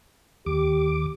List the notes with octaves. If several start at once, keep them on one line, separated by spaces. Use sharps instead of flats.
D#2 G4 D6